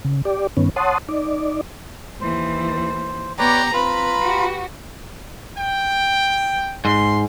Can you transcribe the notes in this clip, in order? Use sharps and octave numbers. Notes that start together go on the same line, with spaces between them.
C#3
G4 D5
G2 D#3 B3 C#4
C#5 F#5 A5 C6 D#6
D#4 D5
D#2 E3 C5
B3 G4 B4 C#5 D5 A#5
C4 F4 B4 A#5 B5
F#4 G4
G5
G#2 C6